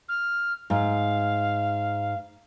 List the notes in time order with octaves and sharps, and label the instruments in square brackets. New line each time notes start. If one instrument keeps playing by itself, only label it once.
[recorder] F6
[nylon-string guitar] G#2 [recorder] F5